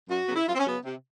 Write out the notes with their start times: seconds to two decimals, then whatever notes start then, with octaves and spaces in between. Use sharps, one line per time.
0.09 F#2 F#4
0.28 C#3 F#3 B3
0.36 E4
0.47 F#2 F4
0.55 C4
0.59 C#4
0.66 C#3 F#3 B3
0.85 C3